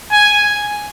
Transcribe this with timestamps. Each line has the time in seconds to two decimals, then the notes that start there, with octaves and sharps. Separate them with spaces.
0.11 G#5